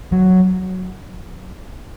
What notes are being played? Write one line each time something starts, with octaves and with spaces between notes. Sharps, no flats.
F#3